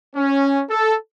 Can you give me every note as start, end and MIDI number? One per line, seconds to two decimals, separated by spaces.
0.16 0.61 61
0.70 0.95 69